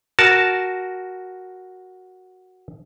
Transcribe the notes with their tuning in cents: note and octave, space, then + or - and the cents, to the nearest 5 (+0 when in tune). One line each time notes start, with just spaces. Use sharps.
F#4 +0 A#4 +0 A5 -5